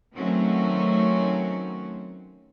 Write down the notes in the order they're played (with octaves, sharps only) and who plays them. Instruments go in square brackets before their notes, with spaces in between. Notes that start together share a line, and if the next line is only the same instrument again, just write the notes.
[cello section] D#3 F#3 A3 C4 C#4 F#4